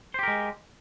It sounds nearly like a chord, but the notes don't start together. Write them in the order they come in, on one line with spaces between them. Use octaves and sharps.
C5 G4 A#4 G#3